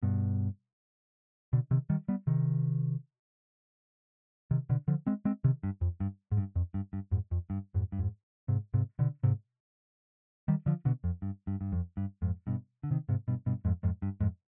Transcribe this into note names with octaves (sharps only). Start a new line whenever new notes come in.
G2 B2
B2 D3
C3 D#3
D#3 G3
G3 B3
C3 D#3
C3 D#3
B2 D3
D3 F3
G#3 C4
G#3 C4
C3 D#3
G2
F2
G2
G#2
G2
F2
G2
G2
F2 G#2
F2
G2
F2 G#2
G2
F2 G#2
G#2 C3
G#2 C3
B2 D3
G#2 C3
D#3 G3
D3 F3
B2 D3
F2
G2
G2
G2
F2
G2
F2 G#2
G2 B2
D3
C3 D#3
G#2 C3
G2 B2
G2 B2
F2 G#2
F2 G#2
G2
F2 G#2